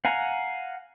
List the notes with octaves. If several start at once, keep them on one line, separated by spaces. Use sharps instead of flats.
F5 F#5 G#5 A#5